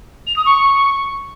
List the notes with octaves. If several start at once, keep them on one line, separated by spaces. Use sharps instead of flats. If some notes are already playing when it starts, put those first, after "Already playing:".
F7
D#6
C#6